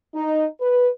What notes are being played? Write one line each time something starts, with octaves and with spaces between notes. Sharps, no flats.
D#4
B4